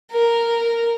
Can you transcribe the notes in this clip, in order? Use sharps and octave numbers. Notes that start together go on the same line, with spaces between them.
A#4